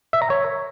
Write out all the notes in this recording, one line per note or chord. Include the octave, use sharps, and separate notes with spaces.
E5
A#5
C#5